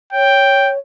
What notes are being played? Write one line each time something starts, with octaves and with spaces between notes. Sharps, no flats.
C#5 G5